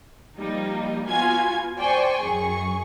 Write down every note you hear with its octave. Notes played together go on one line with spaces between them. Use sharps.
F3 G3 A#3 D#4
B3 F4 F#4 G#5 G#6
C5 D5 G5 G#5 C#6
F#2 G#4 C#6